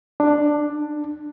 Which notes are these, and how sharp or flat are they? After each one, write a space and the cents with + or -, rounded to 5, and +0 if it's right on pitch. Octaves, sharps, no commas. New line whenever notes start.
D4 +10